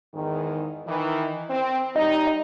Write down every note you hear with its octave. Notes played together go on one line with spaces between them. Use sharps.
E2 G#2 D#3
D#3 E3
C4
G3 D#4 D#5